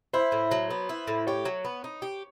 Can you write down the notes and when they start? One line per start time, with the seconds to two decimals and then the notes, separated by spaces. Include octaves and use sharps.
0.13 E4 C5
0.32 A2
0.51 F#3
0.71 B3
0.89 E4
1.07 A2
1.27 G4 C#5
1.45 F#3
1.65 B3
1.84 D#4
2.02 G4